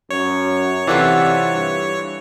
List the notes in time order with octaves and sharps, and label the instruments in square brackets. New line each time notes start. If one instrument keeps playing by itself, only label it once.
[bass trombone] F#2 [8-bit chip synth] C#5
[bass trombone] C3 [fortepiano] E3 A4 D5 [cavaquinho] F4 E5 F#5
[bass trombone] G2